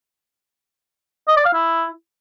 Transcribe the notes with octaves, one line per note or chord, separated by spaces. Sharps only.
D#5
D5
F5
E4